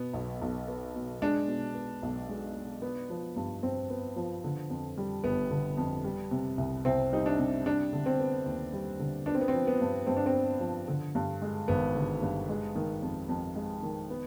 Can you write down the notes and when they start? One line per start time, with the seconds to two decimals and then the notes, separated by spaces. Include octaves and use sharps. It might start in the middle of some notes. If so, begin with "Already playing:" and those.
Already playing: B2 B3
0.13 B1
0.41 B1
0.68 B3
0.95 B2
1.22 G#3 D4
1.48 B2
1.75 B3
2.03 B1
2.29 G#3
2.56 B2
2.82 B3
3.10 F3
3.36 G2
3.63 G2 C4
3.90 B3
4.16 F3
4.44 D3
4.70 F2
4.98 G3
5.24 G1 B3
5.51 D3
5.77 F2
6.04 G3
6.31 C3
6.58 C2
6.85 C2 C4
7.12 G3 D#4
7.26 D4
7.38 C3
7.66 G3 D4
7.93 D3
8.06 C4
8.20 B3
8.46 D#2
8.73 G3
9.00 D3
9.26 B3 D4
9.34 C4
9.41 B3
9.48 C4
9.54 F3
9.67 B3
9.81 G2
10.07 G2 C4
10.17 D4
10.26 C4
10.34 B3
10.60 F3
10.88 D3
11.15 G2
11.42 G#3
11.68 G#1 B3
11.95 D3
12.22 G2
12.49 G#3
12.75 D#3
13.02 F2
13.29 F2
13.56 G#3
13.82 D#3
14.10 B3